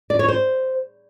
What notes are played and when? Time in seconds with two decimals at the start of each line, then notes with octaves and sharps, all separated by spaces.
0.10 D5
0.19 C#5
0.29 C5